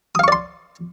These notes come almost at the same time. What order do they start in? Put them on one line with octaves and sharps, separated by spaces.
D#6 F5 C#6 D5 C6